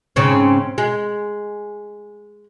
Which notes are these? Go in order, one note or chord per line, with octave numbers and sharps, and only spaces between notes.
G#2 C#3 C4
G#3